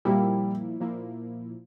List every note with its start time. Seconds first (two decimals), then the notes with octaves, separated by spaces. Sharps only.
0.05 A#2 F3 G3 A#3 E4
0.80 A#2 F3 A#3 E4